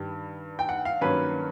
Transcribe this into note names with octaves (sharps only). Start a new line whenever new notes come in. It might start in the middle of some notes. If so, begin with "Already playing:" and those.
Already playing: G2 D#3 G3
G5
F#5
F5
G2 D#3 F#3 A#3 C#4 B4